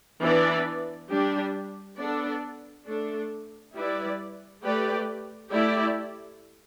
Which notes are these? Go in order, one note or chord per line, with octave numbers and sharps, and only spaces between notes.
E3 B3 D4 B4 D5
G3 D4 G4
B3 D4 A4 D5
A3 D4 A4
G3 E4 B4 D5
A3 G4 B4 D5
A3 E4 G4 D5